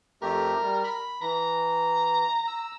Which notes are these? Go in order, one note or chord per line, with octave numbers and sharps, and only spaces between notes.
F2 A3 G4 A#4
G3
B5
E3 A#5
E6